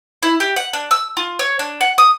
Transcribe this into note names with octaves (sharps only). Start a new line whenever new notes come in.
E4
G4
F#5
D4
E6
F4
C#5
D4
F#5
D#6